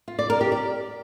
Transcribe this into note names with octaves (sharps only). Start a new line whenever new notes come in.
F4
D5
A#4
G4
D5